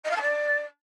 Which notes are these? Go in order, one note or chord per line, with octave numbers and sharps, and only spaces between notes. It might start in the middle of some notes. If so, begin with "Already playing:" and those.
D#5
F5
A5
D5